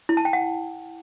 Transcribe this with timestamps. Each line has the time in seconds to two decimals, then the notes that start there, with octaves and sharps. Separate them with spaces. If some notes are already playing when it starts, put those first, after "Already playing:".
0.09 E4
0.17 A5
0.25 G5
0.33 F#5